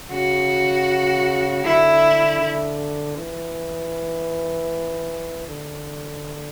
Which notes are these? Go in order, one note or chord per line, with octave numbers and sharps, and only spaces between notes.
C#3 F#4
D3 E4
D3
E3
D3